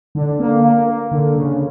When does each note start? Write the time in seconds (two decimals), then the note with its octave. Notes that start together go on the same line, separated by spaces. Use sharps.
0.15 D3
0.40 A#3
0.64 A#3
0.87 A#3
1.11 D3
1.36 C#3